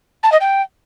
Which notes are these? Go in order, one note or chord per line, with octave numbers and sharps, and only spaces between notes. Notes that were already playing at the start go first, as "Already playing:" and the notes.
A5
D#5
G5